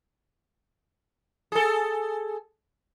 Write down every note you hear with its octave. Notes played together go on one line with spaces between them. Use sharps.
G#4 A4